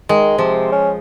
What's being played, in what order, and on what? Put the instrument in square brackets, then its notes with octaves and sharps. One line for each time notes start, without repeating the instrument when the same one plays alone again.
[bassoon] D#3 [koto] G#3
[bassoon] C3 [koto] F3
[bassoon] C#4